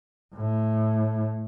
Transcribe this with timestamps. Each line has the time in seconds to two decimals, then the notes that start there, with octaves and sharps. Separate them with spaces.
0.34 A2